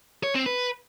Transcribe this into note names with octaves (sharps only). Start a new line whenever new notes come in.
C#5
C4
B4